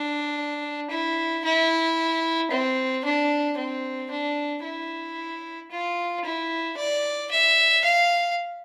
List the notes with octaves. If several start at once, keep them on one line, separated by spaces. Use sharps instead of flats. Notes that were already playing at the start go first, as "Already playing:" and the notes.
Already playing: D4
E4
E4
C4
D4
C4
D4
E4
F4
E4
D5
E5
F5